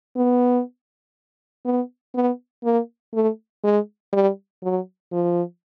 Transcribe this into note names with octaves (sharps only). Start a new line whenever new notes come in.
B3
B3
B3
A#3
A3
G#3
G3
F#3
F3